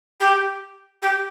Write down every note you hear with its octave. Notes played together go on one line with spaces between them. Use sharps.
G4
G4